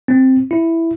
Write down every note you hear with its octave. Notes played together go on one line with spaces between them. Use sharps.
C4
E4